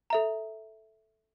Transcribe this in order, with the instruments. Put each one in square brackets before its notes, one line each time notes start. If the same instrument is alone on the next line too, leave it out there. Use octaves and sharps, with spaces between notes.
[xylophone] A4 E5 A#5